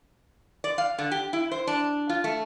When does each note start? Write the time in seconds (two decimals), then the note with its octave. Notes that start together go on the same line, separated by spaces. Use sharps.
0.64 D5
0.78 F5
0.99 D3
1.11 G4
1.33 E4
1.52 C5
1.67 D4
2.09 F4
2.24 A3